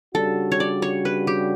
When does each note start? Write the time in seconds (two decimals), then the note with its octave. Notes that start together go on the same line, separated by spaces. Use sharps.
0.14 C#3 G3 D4 F#4 A4
0.52 C#5
0.60 D5
0.82 C#5
1.05 B4
1.27 G4